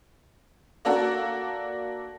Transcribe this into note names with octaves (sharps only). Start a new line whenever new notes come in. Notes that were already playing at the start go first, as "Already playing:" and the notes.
A#3 D4 F#4 A4 A#4